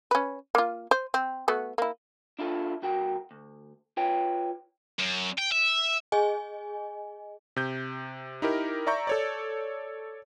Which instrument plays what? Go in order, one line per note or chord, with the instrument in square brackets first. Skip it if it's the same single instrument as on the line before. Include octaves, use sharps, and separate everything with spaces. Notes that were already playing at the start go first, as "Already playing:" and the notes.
[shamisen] C#4 B4
A#3 F4
C5
C4
A3 B3 F#4
A#3 E4
[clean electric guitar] D4 E4 F4 A4
C2 B2 F#4 A#4 G5
D2
F4 B4 C#5 G5
[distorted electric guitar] F#2
G5
E5
[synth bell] G#4 D#5 G#5
[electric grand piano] C3 G6
D#4 E4 G4 A#4
D5 E5 A#5 C#6 G6
A4 C#5 D5